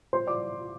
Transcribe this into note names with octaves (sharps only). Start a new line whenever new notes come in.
C5 C6
D5 D6